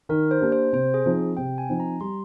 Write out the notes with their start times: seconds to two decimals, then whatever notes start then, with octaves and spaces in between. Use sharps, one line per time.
0.09 D#3 A#4
0.31 C5
0.41 A#3 D4 G4
0.52 C5
0.73 C3 C5
0.94 G#4
1.06 F3 C4 D#4
1.37 C3 G5
1.58 G#5
1.69 F3 C4 D#4
1.80 A#5
2.01 G3 C6